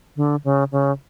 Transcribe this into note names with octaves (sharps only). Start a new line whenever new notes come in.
D3
C#3
C#3